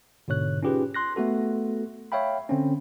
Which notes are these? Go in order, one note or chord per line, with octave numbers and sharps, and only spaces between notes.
G#2 B2 D3 C#5 F#6
C#4 D#4 F4 G4 G#4 B4
C6 F#6 A#6
A3 B3 F#4 A4
C#5 E5 F5 G5 B5
D3 C4 C#4